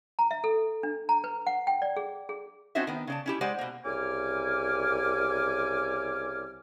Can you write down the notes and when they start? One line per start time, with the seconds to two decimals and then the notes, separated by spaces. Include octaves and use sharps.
0.19 A#5
0.31 E5
0.44 A4
0.83 D4
1.09 A#5
1.24 B4
1.47 F#5
1.67 G5
1.82 D5
1.97 G#4
2.29 G#4
2.75 C4 C#4 D#4 F#4 C5 E5
2.87 D#3 B3
3.07 C#3 D5 A5
3.26 C#4 E4 G4
3.41 G#3 C5 D5 F#5
3.59 B2 A#3
3.85 C2 C#3 G#5 D6 F6